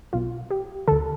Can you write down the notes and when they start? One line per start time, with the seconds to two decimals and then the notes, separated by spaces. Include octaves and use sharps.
0.13 B1 B2 F4
0.50 G4
0.88 D2 D3 A4